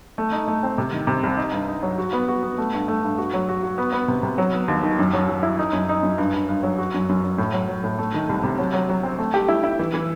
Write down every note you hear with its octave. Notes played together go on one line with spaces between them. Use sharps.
A3
D#4
A3
C4
C3
D#3
C3
C2
D#4
G2
D#4
F#3
F#4
B3
F#4
B3
A3
G2
A3
G2
F#4
F#3
F#4
F#4
B3
B3
C3
C3
F#3
B3
D#2
D#3
F#2
F#3
F#3
E4
D#4
F#2
D#4
F#2
G2
G2
G2
F#3
F#4
F#2
F#2
F#2
A2
F#3
F#3
A2
A3
D#3
C2
C3
F#3
F#3
F#3
C4
A3
G4
E4
E4
E3
E3